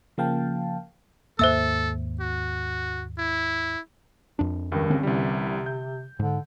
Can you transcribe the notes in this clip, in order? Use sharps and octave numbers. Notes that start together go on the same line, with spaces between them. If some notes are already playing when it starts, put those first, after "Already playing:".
C#3 F3 A#3 F5 G5 A5
D#2 G#2 A#3 A4 C5 E5 E6
F#4
E4
F2 D4
C#2 G2 D#3
D3 C4 C#4
C2 C3 E3 G3
G6
G#2 D3